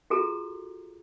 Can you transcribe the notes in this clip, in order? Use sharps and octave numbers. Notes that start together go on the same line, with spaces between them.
F4 F#4 G#4 A4 A#5